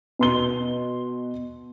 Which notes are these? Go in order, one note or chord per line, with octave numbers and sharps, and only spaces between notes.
B2 C6 G7